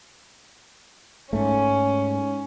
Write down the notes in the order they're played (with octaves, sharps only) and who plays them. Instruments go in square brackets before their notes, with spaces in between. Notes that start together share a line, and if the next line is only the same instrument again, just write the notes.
[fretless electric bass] G#2 A3 [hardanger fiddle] C#4